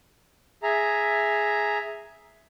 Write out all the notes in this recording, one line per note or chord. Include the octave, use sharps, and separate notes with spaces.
G#4 E5 A#5